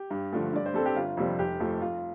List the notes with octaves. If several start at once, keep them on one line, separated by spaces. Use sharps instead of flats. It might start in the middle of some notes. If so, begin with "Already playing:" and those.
Already playing: G4
G2
D3 F3 A3
G2 D5
C5
G3 C4 A4
G4
G1 F4
F2 C3 G3 C4
F1 G4
F2 F3 A3
F2 F4